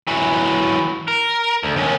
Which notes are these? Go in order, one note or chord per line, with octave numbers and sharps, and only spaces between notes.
E3 F#3
A#4
D2
D#2 C#4